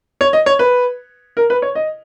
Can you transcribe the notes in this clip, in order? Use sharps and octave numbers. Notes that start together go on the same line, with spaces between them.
C#5
D#5
C#5
B4
A#4
B4
C#5
D#5